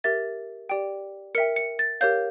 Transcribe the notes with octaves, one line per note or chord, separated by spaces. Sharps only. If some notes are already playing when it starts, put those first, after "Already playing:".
G4 A#4 E5 A6
G4 D5 G5
A#4 E5 G5 C#7
C#7
A6
G4 A#4 C#5 F5 G6